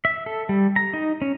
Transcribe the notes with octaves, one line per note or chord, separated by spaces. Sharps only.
E5
A4
G3
A#5
D#4
C#4